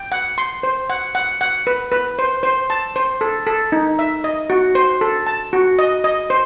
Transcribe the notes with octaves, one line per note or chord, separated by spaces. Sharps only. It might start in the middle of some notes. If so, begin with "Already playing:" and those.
Already playing: G5
F#5
C6
C5
F#5
F#5
F#5
B4
B4
C5
C5
A5
C5
A4
A4
D#4
E5
D#5
F#4
C5
A4
A5
F#4
D#5
D#5
C5